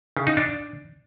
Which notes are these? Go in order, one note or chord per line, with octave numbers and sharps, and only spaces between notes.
C#3
D#4
D4